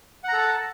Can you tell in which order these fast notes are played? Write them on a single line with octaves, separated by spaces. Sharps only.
F#5 A#5 A4 A5